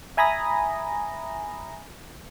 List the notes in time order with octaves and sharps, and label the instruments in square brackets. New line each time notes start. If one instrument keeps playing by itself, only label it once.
[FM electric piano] E5 G#5 A#5 B5 D#6 A#6